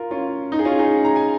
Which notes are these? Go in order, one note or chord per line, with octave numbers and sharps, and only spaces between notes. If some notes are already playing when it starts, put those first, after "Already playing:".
Already playing: F4 A#4
C#4 F4
D#4
G#4
C#4 F4
D#4 G#4
A#5
G#5